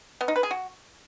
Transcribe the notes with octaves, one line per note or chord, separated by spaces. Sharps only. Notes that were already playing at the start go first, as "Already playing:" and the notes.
B3
D#4
B4
G#4
F#4